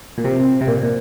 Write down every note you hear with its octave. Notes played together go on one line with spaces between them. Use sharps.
A#2
C3
C3
A#2
A#2